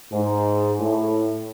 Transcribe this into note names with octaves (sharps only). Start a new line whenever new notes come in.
G#2
A2